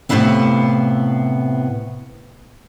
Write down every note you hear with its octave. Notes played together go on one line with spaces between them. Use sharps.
A2 C3 A3 B3 E4 F5